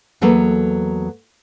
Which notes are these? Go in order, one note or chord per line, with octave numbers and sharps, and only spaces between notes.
E2 F#3 A3 A#3 B4